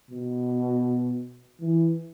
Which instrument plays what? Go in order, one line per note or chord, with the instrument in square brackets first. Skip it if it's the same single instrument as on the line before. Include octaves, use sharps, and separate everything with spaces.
[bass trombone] B2
E3